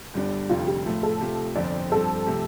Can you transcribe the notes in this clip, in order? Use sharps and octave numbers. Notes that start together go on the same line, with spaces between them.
G1 G2 G3 D4
F1 F2 D3 G3 F4
G4
A2 F3 A3 F4
A4
C3 A3 F4
G1 F2 D3 F3 C4 D5
G2 F3 C4 A4
C3 F3 A3